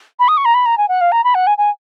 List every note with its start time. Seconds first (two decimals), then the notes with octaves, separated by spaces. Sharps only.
0.19 B5
0.28 D#6
0.37 C#6
0.45 A#5
0.54 B5
0.66 A#5
0.78 G#5
0.88 F#5
1.01 F5
1.12 A#5
1.24 B5
1.35 F#5
1.47 G#5
1.58 G#5